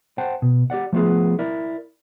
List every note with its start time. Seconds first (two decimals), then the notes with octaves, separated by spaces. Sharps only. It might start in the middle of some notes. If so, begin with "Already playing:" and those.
0.18 C5 F#5 G5 A5
0.42 B2
0.70 G4 A#4 D5 F#5
0.93 F3 A3 B3 F4 G#4
1.39 E4 A#4 D5